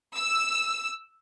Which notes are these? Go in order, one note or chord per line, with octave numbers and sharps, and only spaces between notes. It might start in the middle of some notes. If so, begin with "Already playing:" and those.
E6